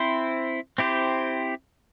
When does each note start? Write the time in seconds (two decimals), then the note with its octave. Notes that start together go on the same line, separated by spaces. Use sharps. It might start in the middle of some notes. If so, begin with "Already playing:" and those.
Already playing: C4 E4 C5
0.78 C4 E4 G4 C5